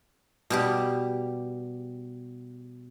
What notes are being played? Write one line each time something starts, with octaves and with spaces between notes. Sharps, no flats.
B2 G3 G4